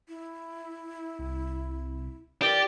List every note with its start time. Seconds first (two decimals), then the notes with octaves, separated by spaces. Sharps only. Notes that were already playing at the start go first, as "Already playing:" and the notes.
0.09 E4
1.19 C2
2.42 E3 G4 A#4 D5